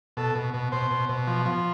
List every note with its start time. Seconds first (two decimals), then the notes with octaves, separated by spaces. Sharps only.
0.17 B2 A4
0.35 B2
0.54 B2
0.72 B2 C5
0.91 B2
1.09 B2
1.27 F3
1.46 F3